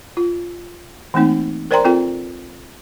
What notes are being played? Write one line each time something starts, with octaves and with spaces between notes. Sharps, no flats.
F4
E3 A3 A#3 C4 D#4
A#4 C5 D5 G5 A#5 C6
C4 F4 A4 G5